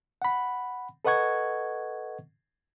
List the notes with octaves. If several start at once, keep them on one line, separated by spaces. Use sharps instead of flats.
F#5 B5
A4 B4 D#5 F#5 C#6 G#6